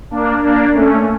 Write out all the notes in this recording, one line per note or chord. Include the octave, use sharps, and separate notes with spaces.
A#3 D4
A#3 D4
A3 C#4